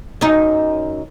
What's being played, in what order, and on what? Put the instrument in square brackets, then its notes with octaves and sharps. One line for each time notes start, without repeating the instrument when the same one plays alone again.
[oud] F#2 D#4